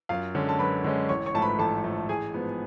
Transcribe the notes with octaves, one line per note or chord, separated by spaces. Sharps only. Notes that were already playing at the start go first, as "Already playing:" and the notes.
F#2 F4 F5
D3 G#3 C#4
A5
F#2 B4 B5
D3 G#3 C#4
A1 C#5 C#6
C#5 C#6
G#2 F3 A3 A5
B4 B5
A1 A4 A5
G#2 F3 A3
A1 G#4 G#5
G#2 F3 B3